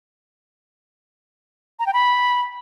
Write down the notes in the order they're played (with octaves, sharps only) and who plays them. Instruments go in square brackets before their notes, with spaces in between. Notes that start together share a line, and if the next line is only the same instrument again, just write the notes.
[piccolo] A#5
G5
B5